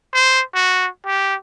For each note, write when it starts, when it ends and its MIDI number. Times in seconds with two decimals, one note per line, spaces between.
0.13 0.42 72
0.54 0.87 66
1.06 1.35 67